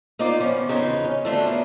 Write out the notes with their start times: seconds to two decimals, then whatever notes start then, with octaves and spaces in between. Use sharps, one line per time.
0.19 A#3 D#4 F4 D5
0.40 D#3 F3 B3 C#4
0.69 E2 A#2 C#3 F3 D#4 B4
1.04 C#4
1.25 D3 A3 D4 F4 F#4 A4
1.46 C#3 A#3 B3